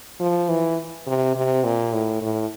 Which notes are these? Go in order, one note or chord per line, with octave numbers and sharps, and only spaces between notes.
F3
E3
C3
C3
A#2
A2
A2